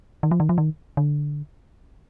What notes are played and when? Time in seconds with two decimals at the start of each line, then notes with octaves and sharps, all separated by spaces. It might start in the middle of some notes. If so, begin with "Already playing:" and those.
0.23 D#3
0.31 F3
0.40 D#3
0.49 F3
0.58 D#3
0.97 D3